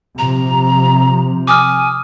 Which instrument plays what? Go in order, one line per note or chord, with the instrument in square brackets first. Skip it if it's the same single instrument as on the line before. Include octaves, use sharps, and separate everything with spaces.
[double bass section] C3 F3 [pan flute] A#5
[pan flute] G#5 [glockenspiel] D6 D#6 F6